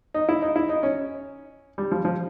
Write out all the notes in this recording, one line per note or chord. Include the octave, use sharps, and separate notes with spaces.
D#4
E4
D#4
E4
D#4
C#4
G3
F3
F3